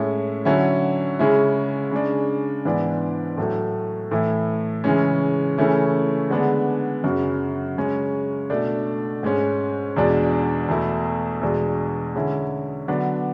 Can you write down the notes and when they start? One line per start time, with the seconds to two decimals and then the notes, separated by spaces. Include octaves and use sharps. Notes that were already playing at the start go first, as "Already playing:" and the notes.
Already playing: A2 G#3 C#4 E4
0.45 D3 F#3 C#4 E4
1.19 C#3 G#3 C#4 E4
1.91 C#3 G#3 D4
2.65 G#2 E3 B3 D4
3.37 A2 F#3 A3
4.11 A2 E3 A3 E4
4.84 C#3 E3 G#3 C#4
5.58 C#3 E3 A3 C#4 E4
6.30 D3 G#3 B3 D4
7.04 F#2 C#3 F#3
7.77 C#3 G#3 C#4
8.50 B2 A3 D4
9.23 G#2 G#3 C#4
9.96 E2 B2 G#3 D4
10.68 E2 B2 A3 E4
11.41 E2 B2 G#3 D4
12.15 D3 G#3 C#4 E4
12.88 D3 F#3 B3 D4